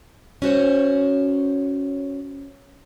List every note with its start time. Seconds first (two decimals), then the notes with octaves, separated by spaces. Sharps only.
0.42 C#4 F#4 C5 C#5